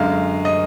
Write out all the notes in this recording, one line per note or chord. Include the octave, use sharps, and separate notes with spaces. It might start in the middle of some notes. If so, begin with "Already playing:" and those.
Already playing: F#2 D3 G#3 F5
D#5